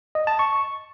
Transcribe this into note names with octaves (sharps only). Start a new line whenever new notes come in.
D#5
A5
C#6